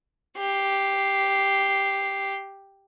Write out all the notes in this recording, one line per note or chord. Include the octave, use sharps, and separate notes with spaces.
G4 C7